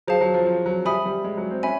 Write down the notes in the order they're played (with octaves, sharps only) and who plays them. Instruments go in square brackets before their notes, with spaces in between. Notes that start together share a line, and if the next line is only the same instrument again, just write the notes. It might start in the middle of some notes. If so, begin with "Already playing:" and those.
[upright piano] F#3 [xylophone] G#4 C5 F5 A5
[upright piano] F#3
F3
F3
F#3
[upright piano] G3 [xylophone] E5 G#5 B5 D#6
[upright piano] G3
G#3
F#3
C4
[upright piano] C#4 [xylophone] E5 G#5 B5